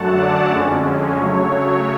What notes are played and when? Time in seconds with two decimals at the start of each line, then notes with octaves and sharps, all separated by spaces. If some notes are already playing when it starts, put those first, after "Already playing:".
Already playing: F#2 D3 F#3 A3 F#5 A5
0.16 D5 F#5
0.49 F2 D3 G#3 C#4
1.15 C#3 F#3 A3 C#5